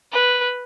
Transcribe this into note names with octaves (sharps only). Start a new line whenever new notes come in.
B4